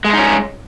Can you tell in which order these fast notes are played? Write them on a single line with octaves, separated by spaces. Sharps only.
G#3 A3 D#4 C#4